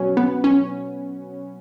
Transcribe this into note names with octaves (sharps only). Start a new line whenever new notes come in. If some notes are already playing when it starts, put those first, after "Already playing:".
Already playing: B2 F#3 C#4
B3
C#4